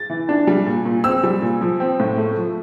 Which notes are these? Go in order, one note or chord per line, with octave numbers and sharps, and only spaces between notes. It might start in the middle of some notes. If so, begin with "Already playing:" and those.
Already playing: A6
E3
D4
G3
A#2
A#2
C4 E6
G3
A#2
F3
C4
A2
A3
F3